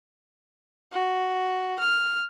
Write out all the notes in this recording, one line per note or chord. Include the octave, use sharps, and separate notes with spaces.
F#4
F6